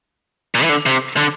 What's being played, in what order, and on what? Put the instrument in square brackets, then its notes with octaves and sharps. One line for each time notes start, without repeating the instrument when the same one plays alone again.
[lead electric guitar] A#2
E3
D3
C3
D3